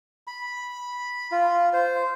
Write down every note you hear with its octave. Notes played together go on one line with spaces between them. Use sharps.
B5
F4
C5